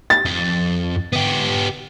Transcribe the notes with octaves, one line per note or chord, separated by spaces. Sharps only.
A6
F2
B3 G4